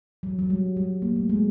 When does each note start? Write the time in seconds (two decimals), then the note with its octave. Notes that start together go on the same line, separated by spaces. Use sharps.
0.23 F#3
0.39 F#3
0.50 G3
0.77 G3
1.02 A#3
1.16 A3
1.29 G#3